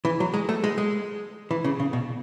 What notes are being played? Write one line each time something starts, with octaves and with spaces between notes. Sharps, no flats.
E3
F#3
G#3
A3
G#3
G#3
E3
C#3
C#3
B2